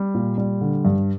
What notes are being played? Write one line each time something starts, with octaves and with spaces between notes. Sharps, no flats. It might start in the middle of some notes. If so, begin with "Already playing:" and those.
Already playing: G3
A#2
G3
D3
G2